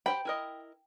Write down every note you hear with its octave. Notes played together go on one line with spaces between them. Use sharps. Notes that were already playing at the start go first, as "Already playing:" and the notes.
G4 C5 G5 B5
E4 A#4 D#5